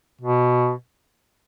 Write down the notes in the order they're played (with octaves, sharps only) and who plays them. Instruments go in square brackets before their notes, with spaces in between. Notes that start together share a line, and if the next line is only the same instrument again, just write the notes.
[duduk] B2